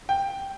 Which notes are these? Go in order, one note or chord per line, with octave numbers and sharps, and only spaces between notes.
G5